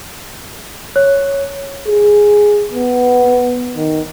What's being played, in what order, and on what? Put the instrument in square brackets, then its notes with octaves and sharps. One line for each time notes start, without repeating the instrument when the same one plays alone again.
[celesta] C#5
[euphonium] G#4
B3
D#3